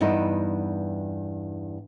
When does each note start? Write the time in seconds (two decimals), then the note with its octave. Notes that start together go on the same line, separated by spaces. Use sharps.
0.01 E2 G2 D#4 E4 B4